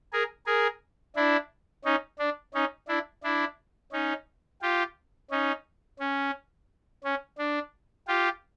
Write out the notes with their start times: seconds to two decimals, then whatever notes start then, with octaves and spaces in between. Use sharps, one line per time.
0.13 G#4 A#4
0.46 G#4 A#4
1.16 D4 E4
1.85 C#4 D#4
2.19 D4
2.54 C#4 D#4
2.88 D4 E4
3.24 D4 E4
3.92 C#4 D#4
4.62 F4 G4
5.31 C#4 D#4
6.00 C#4
7.04 C#4
7.38 D4
8.08 F4 G4